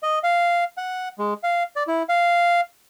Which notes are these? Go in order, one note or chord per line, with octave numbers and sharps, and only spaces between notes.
D#5
F5
F#5
G#3
F5
D5
E4
F5